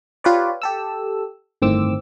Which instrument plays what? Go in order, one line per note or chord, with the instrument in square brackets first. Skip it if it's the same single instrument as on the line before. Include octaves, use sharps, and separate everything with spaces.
[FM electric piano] F4 G4 B4 C#5 D5
G4 A4 E6
G1 A2 D#3 C4 D6 E6